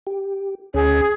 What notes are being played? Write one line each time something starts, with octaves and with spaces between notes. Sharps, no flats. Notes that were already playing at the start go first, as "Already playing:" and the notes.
G4
D2 C#4 G#4